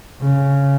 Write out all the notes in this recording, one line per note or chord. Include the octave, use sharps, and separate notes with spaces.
C#3